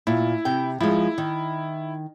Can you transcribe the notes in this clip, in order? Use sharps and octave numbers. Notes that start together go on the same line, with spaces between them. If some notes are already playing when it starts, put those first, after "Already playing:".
A#2 E4
C3 G5
F3 G#3 E4
D#3